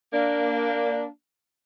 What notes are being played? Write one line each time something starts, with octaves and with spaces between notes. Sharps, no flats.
A#3 D4